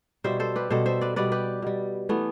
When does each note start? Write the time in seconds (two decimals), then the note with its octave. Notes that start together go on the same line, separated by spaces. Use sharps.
0.24 B2 G3 C5 E5
0.40 A4 C5
0.56 G4 B4
0.70 B2 G3 A4 C5
0.86 C5 E5
1.01 B4 D5
1.16 B2 G3 B4 D5
1.32 G4 B4
1.62 B2 G3
2.09 E3 A3 B3